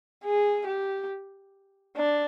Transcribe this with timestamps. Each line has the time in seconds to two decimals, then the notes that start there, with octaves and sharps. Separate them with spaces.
0.25 G#4
0.68 G4
1.97 D4